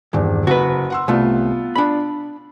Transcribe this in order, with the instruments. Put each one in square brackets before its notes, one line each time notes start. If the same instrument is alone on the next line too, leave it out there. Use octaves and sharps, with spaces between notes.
[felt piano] D#1 [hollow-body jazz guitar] E2 G2
[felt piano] F#1 [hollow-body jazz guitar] F#4 B4
[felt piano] F#5 C6 E6
[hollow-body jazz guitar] C2 A3 [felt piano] B3 F4
[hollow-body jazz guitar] D4 B5